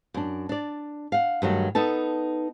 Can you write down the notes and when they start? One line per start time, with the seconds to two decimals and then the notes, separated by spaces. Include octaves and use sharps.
0.14 F#2 D4
0.49 D4 D5
1.12 F5 F#5
1.42 G2 D#3 F#3 A3
1.75 B3 D#4 A4 A5